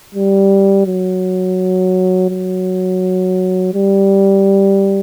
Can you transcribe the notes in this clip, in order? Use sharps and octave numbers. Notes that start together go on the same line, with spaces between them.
G3
F#3
F#3
G3